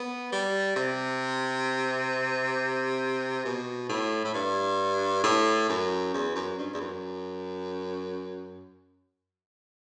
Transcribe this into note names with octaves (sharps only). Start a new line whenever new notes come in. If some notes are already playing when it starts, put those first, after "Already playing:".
Already playing: B3
G3
C3
B2
A2
A2
G2
A2
F#2
E2
F#2
G2
E2
F#2